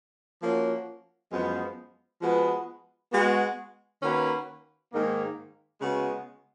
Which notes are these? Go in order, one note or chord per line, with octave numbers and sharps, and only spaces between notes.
F3 A#3 C#4 F#4
F#2 F3 G#3 B3
F3 G#3 B3 F#4 B4
G#3 B3 F#4
D#3 A#3 C#4 F#4 B4
G#2 D#3 A#3
C#3 G#3 B3 F#4